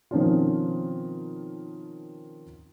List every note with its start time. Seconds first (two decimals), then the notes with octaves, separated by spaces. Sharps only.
0.11 B2 D#3 F3 C4 C#4 F4